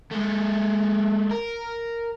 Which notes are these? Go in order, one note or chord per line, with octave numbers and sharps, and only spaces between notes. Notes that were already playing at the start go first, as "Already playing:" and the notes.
G#3 A3
A#4